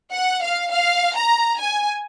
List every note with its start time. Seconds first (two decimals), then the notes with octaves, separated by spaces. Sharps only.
0.12 F#5
0.42 F5
0.70 F5
1.16 A#5
1.59 G#5